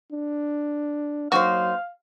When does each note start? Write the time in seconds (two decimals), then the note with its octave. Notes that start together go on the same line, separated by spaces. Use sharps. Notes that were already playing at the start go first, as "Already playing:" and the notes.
0.12 D4
1.32 F#3 A#3 D#4 F#4 C5 F5